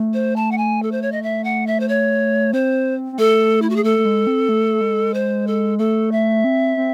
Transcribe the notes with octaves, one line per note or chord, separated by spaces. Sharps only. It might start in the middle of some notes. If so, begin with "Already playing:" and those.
Already playing: A3
C5
A5
F#5
G#5
A4
C5
C#5
D#5
E5
F#5
E5
C5
C#5
C4 C5
C4
A3 A4
E4
F#4
G#4
A3 A4
A3
G#3
C4
A3
G#3
C5
A4
A3 A4
E5
C4
C4